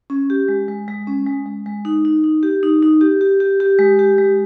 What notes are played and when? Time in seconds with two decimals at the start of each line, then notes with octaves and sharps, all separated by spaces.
0.10 C#4
0.30 G4
0.48 G#3
0.68 G#3
0.88 G#3
1.07 C#4
1.26 G#3
1.46 G#3
1.66 G#3
1.85 D#4
2.05 D#4
2.24 D#4
2.43 G4
2.63 D#4
2.83 D#4
3.01 G4
3.21 G4
3.40 G4
3.60 G4
3.79 G#3
3.99 G4
4.18 G#3